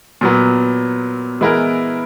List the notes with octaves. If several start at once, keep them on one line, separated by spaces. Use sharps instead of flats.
A#2 F#3 B3
E3 G#3 B3 E4 A#4